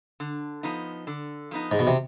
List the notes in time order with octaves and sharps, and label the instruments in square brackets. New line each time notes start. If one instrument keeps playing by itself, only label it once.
[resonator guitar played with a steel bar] D3
F3 B3 D#4
D3
F3 B3 D#4
[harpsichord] G#2
B2
C3